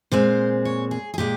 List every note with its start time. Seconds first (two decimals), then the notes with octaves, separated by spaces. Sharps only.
0.12 A#2 G#3 C4 C5
0.65 C#5
0.91 G#4
1.14 G#4
1.18 A#2 G#3 G4